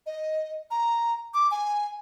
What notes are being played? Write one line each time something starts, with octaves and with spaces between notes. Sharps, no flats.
D#5
A#5
D6
G#5